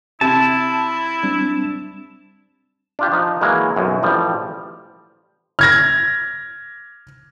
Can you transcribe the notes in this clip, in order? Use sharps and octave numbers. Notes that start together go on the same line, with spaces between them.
C3 E4 A5
G3 C4 D4
D4 F4 G4
F3 D#4
E3 F#3 G#3 A#3
B1 F#2
A1 F3 G3
F6 G#6 A#6